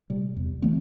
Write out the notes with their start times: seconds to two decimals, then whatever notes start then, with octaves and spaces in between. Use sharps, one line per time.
0.10 C3 G3
0.36 E2
0.62 E3 A3 C4